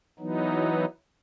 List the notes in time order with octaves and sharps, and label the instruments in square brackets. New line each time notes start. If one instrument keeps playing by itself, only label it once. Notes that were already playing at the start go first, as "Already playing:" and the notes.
[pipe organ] E3 F#3 B3 D#4